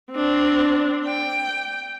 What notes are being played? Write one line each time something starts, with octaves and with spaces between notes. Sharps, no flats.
C4 D4
G5